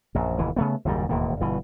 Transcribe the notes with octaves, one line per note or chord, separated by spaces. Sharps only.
A#1 F#2
F1 D#2 E3
C#3 A3 B3
F#1 D#2 G#2 G3
E1 D#2 A2 A#3
G1 G2 B2 E3